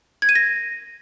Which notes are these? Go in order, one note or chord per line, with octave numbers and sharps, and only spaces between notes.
G#6
D#7
A#6